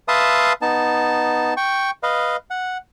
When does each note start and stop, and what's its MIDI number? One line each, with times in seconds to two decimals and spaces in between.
0.08 0.53 71
0.08 0.53 76
0.08 0.53 77
0.08 0.53 81
0.08 0.53 84
0.08 0.53 87
0.62 1.54 59
0.62 1.54 63
0.62 1.54 81
1.57 1.91 79
1.57 1.91 85
2.03 2.36 71
2.03 2.36 75
2.03 2.36 77
2.51 2.78 78